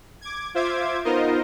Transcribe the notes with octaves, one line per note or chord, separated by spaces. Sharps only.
D6 G#6
F4 C5 E5 D6 G#6
B3 D#4 F4 A#4 C5 D#5